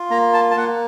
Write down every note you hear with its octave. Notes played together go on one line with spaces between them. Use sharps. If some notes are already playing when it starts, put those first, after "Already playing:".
Already playing: F4
A#3 A#5
A5
A5
A#3 F#5